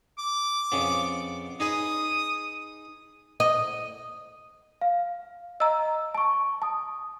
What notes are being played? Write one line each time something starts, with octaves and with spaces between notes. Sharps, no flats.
D6
F2 C#3 B3
D#4 G#4 B4 D#6
D#5
F5
D#5 A#5 E6
A5 C#6
A5 D#6